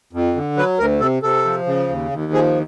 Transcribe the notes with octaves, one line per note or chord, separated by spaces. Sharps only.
F2
D3
F#3 B4
D2 A#4
C3 A4
C3 A4
F3
C#3
D#2
D#2
F3 G#4